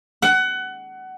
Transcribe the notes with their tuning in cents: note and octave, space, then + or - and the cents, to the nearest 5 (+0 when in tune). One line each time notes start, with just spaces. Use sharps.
F#5 +20